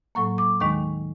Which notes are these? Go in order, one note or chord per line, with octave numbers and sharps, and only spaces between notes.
A2 F#3 A#3 C#6
D6
D#2 D#3 G#3 C#6